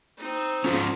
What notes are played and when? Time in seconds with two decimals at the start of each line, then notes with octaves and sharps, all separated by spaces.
0.17 C4 D#4
0.64 C#4 F4 C5